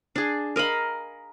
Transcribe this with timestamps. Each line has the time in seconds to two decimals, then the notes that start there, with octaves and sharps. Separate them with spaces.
0.16 D4 G#4
0.56 A#4 D#5 F5 B5